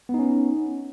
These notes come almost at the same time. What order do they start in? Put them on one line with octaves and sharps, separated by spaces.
B3 D#4 C#4